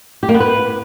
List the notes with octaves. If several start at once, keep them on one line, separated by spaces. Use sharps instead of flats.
G4
A#3
B3
B4